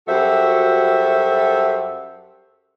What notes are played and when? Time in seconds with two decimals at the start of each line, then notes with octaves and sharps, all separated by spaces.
0.07 F#2 G3 F#4 A4 C5 E5